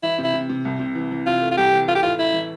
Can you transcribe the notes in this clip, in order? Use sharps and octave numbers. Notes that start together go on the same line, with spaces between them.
E3 E4
C3
E4
C3
C3
C2
C3
E3
E3
C3 F4
A3
F4
C2 G4
E3
A3 F4
G4
A2 F4
A3 E4
E3